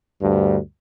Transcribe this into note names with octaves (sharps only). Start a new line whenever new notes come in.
D2 G2